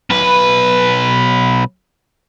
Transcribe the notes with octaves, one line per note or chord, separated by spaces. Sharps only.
B1 B4